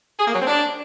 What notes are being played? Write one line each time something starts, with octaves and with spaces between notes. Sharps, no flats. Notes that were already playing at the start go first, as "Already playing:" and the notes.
G#4
A#3
F#3
C4
D4